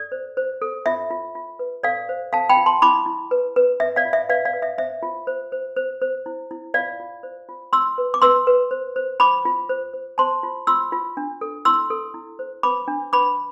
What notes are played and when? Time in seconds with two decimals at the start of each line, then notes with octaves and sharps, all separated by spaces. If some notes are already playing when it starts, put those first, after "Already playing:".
Already playing: A4 D5
0.12 C5
0.37 C5
0.62 A4
0.86 F4 E5
1.10 F4
1.35 F4
1.59 B4
1.83 A4 D5 F5
2.09 C5
2.32 A4 F5 A5
2.50 G5 B5
2.57 F4
2.66 A5 C6
2.82 E4 B5 D6
3.06 E4
3.31 B4
3.56 B4
3.80 B4 E5
3.96 D5 F5
4.05 F4
4.13 E5
4.29 B4 D5 F5
4.45 D5 F5
4.53 B4
4.62 E5
4.78 C5 E5
5.03 F4
5.27 C5
5.52 C5
5.76 C5
6.02 C5
6.26 E4
6.51 E4
6.74 F4 D5 F5
7.00 F4
7.23 C5
7.49 F4
7.73 F4 C6 E6
7.98 B4
8.14 D6
8.22 B4 C6 E6
8.47 B4
8.71 C5
8.96 C5
9.20 F4 B5 D6
9.45 F4
9.69 C5
9.93 C5
10.18 C5 A5 C6
10.43 F4
10.67 F4 C6 E6
10.92 F4
11.17 D4
11.41 A4
11.65 E4 C6 E6
11.90 A4
12.14 E4
12.39 C5
12.63 B4 B5 D6
12.88 D4
13.13 B4 B5 D6